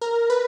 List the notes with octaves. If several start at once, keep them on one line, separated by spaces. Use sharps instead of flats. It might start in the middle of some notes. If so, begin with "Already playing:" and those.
A#4
B4